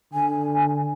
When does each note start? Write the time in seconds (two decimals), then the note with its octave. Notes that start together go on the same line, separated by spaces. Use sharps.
0.14 D3 G#5